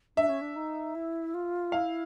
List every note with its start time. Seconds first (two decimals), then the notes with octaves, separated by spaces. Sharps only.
0.17 D4 E5
0.29 C#4
0.41 D4
0.56 D#4
0.95 E4
1.34 F4
1.72 E4 F5